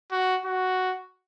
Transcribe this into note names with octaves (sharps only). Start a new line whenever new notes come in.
F#4
F#4